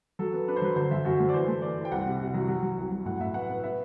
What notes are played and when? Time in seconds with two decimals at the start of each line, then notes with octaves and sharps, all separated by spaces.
0.19 F#3 A4
0.33 B3
0.48 D4 B4
0.56 C5
0.62 F#3 B4
0.76 D3 C5
0.91 F#2 E5
1.05 F#2 F#4
1.20 A3 C5
1.29 D5
1.34 E3 C5
1.48 A3
1.62 E3 D5
1.77 E3
1.85 G5
1.92 C2 F#5
2.06 C3
2.20 C3
2.34 F#3
2.48 F#3
2.62 F#3
2.78 C2
2.92 F#3
3.06 A2 F#5
3.20 A2 E5
3.34 B3 F#5
3.49 B3
3.64 B3 E5